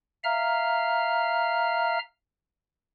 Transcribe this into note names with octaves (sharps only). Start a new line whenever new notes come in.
E5 F5 A#5 F6